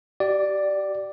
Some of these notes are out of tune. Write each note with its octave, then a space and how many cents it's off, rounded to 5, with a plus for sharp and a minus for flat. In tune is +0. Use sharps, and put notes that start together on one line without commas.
G4 -35 D5 +5